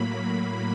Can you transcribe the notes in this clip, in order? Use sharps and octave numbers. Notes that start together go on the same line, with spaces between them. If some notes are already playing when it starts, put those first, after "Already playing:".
Already playing: A2 F#3 A#3 B5